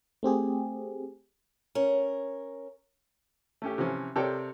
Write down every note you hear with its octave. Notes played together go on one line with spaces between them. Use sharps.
A3 C4 G4 G#4
C#4 A#4
A3 C#4 G4
C3 E3 F3 C#4
C3 A4 A#4 C#5 D5 G5